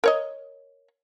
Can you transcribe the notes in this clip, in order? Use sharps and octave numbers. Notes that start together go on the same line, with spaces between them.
A#4 C#5 D#5